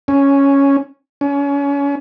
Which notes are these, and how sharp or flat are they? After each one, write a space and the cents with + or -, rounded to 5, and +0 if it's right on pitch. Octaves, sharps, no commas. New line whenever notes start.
C#4 +0
C#4 +30